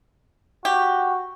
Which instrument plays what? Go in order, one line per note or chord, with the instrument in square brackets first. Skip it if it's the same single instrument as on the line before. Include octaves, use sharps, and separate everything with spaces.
[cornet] F#4 [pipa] G4